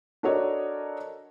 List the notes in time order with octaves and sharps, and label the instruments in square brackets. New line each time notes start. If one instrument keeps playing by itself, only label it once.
[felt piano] D4 F#4 A4 A#4 C#5 D#5